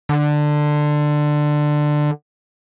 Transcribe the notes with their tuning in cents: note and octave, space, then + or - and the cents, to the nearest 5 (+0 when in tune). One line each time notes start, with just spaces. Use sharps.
D3 +15